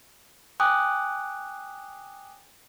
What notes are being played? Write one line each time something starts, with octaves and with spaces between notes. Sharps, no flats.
G5 G#5 D6 D#6 F#6